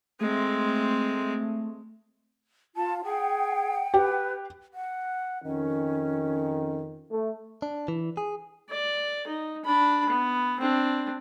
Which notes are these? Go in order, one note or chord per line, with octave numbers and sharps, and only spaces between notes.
G#3 A3 C4
F4 A5
G#4 F#5 G5
G4 B4
F#5
F2 D#3 C#4
A3
D4
E3
G#4
D5
D#4
D4 B5
B3
C4 D4